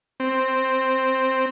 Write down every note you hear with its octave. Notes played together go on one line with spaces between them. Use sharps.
C4